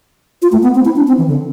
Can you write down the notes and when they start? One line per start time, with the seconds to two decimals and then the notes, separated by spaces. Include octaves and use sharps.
0.42 F4
0.52 A3
0.63 B3
0.75 C4
0.85 E4
0.96 D4
1.08 C4
1.18 E3
1.28 D3